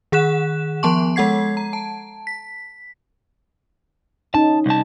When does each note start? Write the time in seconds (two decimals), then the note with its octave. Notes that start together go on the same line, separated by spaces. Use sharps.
0.12 D#3 G#4 F#5 F#6 E7
0.83 F3 B3 A5 C6 C#6
1.16 G#3 A4 F#5 G#6 C7
1.57 A#5
1.73 A5
2.27 B6
4.34 C#4 D#4 A5
4.66 C2 A5